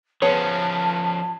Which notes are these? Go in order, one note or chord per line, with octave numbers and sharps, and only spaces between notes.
F3 B3 C#4 G#4 C#5 A5